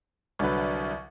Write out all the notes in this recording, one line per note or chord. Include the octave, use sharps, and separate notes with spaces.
C2 D3 F#3 B4